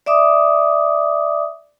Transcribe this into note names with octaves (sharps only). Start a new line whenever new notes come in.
D5 E5 D6 D#6